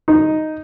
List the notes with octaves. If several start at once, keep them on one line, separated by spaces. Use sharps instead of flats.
D#4